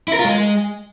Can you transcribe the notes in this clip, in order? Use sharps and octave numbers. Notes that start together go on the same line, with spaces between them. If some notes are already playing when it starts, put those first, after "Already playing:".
E4
A#4
F4
G#3